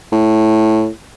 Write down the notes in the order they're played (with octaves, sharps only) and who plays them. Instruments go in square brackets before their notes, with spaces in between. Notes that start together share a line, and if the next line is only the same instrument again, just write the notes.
[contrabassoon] A2